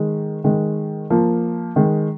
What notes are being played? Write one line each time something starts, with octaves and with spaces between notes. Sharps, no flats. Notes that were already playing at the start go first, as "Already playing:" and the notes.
Already playing: D#3 G#3
D#3 G#3
F3 A#3
D#3 G#3